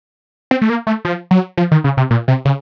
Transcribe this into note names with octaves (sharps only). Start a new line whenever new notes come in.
C4
A3
A#3
A3
F3
F#3
F3
D#3
C#3
C3
A#2
C3
C#3